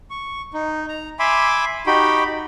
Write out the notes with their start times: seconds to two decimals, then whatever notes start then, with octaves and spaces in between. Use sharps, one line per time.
0.10 C#6
0.54 D#4
0.89 A#5
1.19 E5 G#5 B5 C6 D6
1.86 D#4 F#4 G4 G5 B5